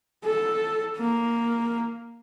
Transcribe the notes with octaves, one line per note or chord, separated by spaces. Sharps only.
A4
A#3